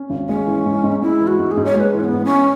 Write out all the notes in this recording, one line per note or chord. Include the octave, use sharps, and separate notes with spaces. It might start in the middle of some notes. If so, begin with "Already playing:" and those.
Already playing: C#4
G#1
G#3 C#4
E3
G#2
G#2
G#3 E4
E3
F#4
G#2
G#4
G#2
C#5
G#3 B4 C#5
E3
C#4
B3
G#2
C#4